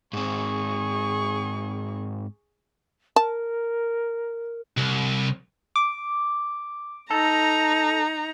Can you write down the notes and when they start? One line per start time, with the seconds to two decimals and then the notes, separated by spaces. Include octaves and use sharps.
0.13 G#2 C4 G#4 C#6
3.16 A#4 A5
4.77 C2
5.76 D6
7.11 D#4 A4 A#5